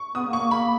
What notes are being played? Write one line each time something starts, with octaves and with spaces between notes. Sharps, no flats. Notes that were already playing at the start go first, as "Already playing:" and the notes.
Already playing: C#6
B3 D#6
A#3
C#6
A#3
A#3 B5